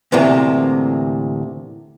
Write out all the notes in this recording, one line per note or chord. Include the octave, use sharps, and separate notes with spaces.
D2 A2 C3 E3 A#3